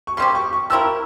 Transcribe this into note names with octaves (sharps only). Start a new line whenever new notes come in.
C#6
C#3 G3 C4 G4 C6
C#6
C#6
F3 C4 E4 A#4 E6